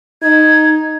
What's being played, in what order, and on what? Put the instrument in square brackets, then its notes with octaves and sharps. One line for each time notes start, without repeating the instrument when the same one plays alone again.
[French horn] D#4 [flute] G#6